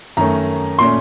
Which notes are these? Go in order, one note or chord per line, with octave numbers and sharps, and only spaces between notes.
F#2 D#3 A3 C#4 A#5
A#2 A3 C#4 C6